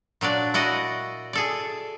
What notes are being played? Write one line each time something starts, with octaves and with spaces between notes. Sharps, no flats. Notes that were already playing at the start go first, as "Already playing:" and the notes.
A#2 F#3 D4 D5
E4 F#4 D5 D#5
G#4 A4 D5